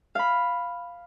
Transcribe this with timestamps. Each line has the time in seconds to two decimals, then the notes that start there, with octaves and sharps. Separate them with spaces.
0.15 F5 B5